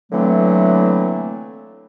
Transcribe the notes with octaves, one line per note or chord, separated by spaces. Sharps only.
D3 E3 F#3 A3 A#3 C4